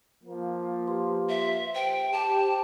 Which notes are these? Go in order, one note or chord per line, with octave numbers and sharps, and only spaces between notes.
F3 A#3
G4 B4 C6
E5
C5 G5
G4 A5